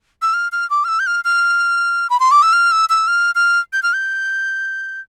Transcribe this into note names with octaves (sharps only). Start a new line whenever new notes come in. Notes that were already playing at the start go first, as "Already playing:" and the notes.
E6
F6
F6
D6
F6
E6
G6
F6
F6
B5
C6
D6
E6
F6
E6
E6
F6
F6
G6
F6
G6